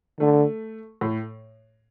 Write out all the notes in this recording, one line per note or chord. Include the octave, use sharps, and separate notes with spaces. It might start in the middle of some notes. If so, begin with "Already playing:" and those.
D3 A3
A2